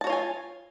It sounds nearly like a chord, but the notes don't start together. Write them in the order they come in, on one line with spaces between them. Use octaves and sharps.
A5 F#4 C#5 F4 G#5